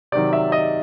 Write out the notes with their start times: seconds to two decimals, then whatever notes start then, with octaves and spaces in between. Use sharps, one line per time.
0.12 C3 D#3 F#3 D5
0.33 E5
0.52 D#5